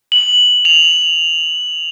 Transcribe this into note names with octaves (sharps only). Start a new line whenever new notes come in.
F#7
F7